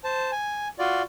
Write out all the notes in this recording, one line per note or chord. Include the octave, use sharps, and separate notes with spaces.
C5 A5
G#5
F4 F#4 D5